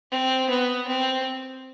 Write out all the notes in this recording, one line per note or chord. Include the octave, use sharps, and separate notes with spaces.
C4
B3
C4